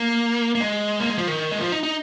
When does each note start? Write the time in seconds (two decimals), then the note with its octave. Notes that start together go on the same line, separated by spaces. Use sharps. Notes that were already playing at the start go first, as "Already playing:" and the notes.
Already playing: A#3
0.55 A#3
0.60 G#3
1.00 A#3
1.10 G#3
1.18 F3
1.27 D#3
1.51 G#3
1.60 F3
1.72 D#4
1.83 D#4